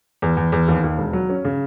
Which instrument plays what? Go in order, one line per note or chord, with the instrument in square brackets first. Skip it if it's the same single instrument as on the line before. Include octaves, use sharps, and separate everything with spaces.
[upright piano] E2
E2
E2
D#2
D#2
E1
F#3
C#4
C#3